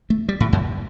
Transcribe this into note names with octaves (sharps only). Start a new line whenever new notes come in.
A3
G3
A2
F#2